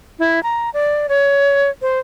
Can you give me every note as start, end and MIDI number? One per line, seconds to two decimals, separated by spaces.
0.19 0.42 64
0.43 0.70 82
0.74 1.07 74
1.09 1.70 73
1.82 1.99 72